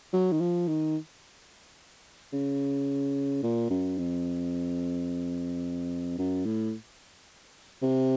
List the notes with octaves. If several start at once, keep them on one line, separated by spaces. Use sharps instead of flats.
F#3
D#3
F3
D#3
C#3
A#2
F#2
F2
F#2
A2
C3